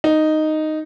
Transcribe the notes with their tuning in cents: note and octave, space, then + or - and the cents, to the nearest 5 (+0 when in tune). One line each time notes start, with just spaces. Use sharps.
D#4 -5